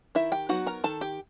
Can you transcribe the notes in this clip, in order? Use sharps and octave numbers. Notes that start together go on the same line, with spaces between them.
D#3 E4 E5
G4 G5
F#3 B3 D#4 F#4 F#5
A#4 A#5
D#3 A4 A5
G4 G5